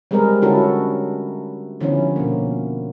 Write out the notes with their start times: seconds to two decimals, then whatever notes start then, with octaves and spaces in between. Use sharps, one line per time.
0.11 G3 G#3 C4 G#4 A#4 B4
0.42 D3 C#4 E4 F#4 A4
1.81 D3 F3 B3 C#4 E4
2.16 B2 A#3